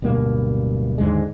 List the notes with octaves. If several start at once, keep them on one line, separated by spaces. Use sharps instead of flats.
D1 G2 B2 A#3
D#2 G#2 D3 G#3